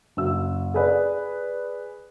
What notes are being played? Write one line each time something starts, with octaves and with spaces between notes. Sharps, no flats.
F#1 F#4 E6
G#4 B4 D5